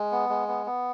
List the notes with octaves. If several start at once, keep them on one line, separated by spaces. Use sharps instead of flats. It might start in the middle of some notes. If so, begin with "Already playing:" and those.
Already playing: G#3
B3
G#3
B3
B3